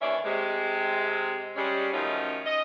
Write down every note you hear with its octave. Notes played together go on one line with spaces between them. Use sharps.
D#2 E3 C#4 D4 D5 E5
C3 G#3
G3 G#3 C#4
D#3 F3 F#3 A3 C#4 D#4
D#5